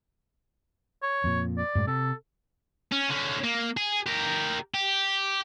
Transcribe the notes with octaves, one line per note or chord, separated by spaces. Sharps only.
C#5
F2 A#2
D5
F#2 A2 G#3
C3 A4
C#4
D3 C#4
A#3
G#4
G4 A#4
G4